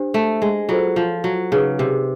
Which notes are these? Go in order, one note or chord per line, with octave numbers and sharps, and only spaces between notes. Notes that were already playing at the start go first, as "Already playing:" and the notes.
Already playing: D4 G4 C5
A3
G#3
F#3 F4 A4 C5
F3
F#3
C#3 D#4 G#4 B4
C3